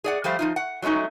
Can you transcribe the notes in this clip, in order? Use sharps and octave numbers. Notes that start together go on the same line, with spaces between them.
G#4 D5 F#5
F3 G3 A3 C5 F5
F3 D#4 F4
F#5
F#3 G#3 A3 C#4 D#4